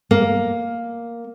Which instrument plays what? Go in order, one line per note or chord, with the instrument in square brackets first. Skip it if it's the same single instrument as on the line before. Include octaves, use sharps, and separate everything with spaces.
[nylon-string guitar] A#3